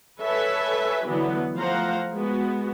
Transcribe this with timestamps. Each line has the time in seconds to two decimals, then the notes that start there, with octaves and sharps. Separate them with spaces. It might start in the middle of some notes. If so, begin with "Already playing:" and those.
0.20 A4 B4 C#5 E5 G#5
1.05 D3 E3 F#3 B3 E4
1.55 F3 A3 C5 F5 F#5 A#5
2.13 G#3 B3 F#4